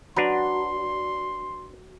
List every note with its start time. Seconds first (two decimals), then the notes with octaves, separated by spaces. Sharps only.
0.16 F#3 D4 B4 A#5 C6